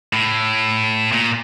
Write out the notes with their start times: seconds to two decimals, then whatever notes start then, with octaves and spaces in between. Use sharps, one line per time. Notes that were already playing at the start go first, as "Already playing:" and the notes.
0.13 A2
1.12 A#2